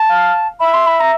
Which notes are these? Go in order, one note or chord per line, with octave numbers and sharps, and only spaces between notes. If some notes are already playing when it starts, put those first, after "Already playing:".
Already playing: A5
F5
E5 B5
C6
B5
A#5